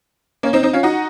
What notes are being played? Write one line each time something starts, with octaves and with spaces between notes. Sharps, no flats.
A#3 C#4
C4 D#4
C4 D#4
C#4 F4
D#4 F#4